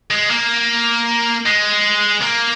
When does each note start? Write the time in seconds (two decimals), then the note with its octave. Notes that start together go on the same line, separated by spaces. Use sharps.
0.11 G#3
0.30 A#3
1.46 G#3
2.22 A#3